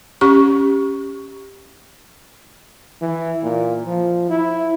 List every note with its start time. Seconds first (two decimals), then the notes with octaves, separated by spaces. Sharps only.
0.21 C#4 G4 C#6
3.02 E3
3.43 A#2
3.86 F3
4.30 E4